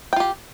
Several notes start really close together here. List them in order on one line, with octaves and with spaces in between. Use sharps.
G5 F4 G4